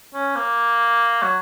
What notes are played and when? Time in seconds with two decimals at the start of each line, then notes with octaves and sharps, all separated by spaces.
0.14 C#4
0.35 A#3
1.22 F#3